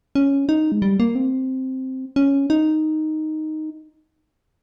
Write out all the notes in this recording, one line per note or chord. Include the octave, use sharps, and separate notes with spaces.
C#4
D#4
G#3
G3
A#3
C4
C#4
D#4